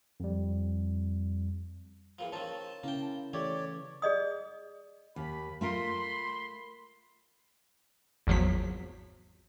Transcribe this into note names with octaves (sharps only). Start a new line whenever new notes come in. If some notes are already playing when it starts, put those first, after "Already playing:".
F2 G3
E2 A#2 F3
D#3 F3 C4 C#5 A5
C#3 A#3 C#4 E4 G5
E3 A3 G4 C#5 D5
G#4 D5 D#5 D#6
D#2 B5
A3 F4 A#4 B5 C6
G#1 E2 F3 F#3 B6